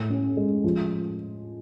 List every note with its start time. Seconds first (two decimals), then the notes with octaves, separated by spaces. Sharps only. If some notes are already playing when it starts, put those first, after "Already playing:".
Already playing: A2
0.10 C#4
0.37 G#3
0.64 F3